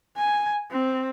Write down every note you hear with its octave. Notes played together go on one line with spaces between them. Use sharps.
G#5
C4